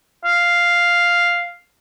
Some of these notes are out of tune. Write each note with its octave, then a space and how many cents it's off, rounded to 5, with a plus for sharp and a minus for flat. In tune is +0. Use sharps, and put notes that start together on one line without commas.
F5 +0